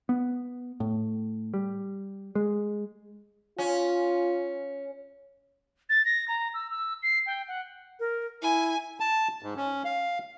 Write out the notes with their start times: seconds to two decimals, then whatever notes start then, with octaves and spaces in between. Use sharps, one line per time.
0.09 B3
0.80 A2
1.54 G3
2.35 G#3
3.59 C#4 F4
5.90 A6
6.05 A#6
6.28 A#5
6.54 E6
6.71 E6
7.03 C7
7.26 G5
7.48 F#5
8.00 A#4
8.42 E4 G#5
9.00 A5
9.43 G#2
9.56 C#4
9.85 F5